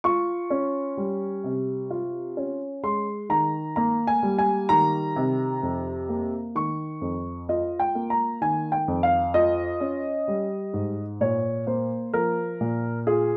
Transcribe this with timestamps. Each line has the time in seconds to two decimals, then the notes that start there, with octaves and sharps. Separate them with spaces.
0.04 F4 C#6
0.50 C#4
0.97 G3
1.44 C3
1.91 F4
2.37 C#4
2.83 G#3 C6
3.29 D#3 A#5
3.76 A#3 A#5
4.07 G#5
4.23 G3
4.39 G#5
4.69 D#3 A#5
5.16 C3
5.63 F2
6.09 A#3
6.55 D#3 C#6
7.01 F2
7.49 F4 D#5
7.80 G5
7.95 A#3
8.10 A#5
8.41 D#3 G#5
8.72 G5
8.88 F2
9.03 F5
9.34 F4 D#5
9.80 C#4
10.28 G3
10.73 G#2
11.21 A#2 C#5
11.67 A#3 C5
12.14 F3 A#4
12.61 A#2
13.07 F4 G#4